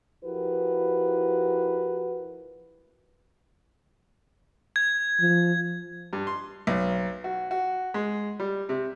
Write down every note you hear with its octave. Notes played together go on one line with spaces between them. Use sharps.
F3 E4 F#4 G4 A#4 B4
G#6
F3
G2
C6
B1
F#4
F#4
G#3
G3
C3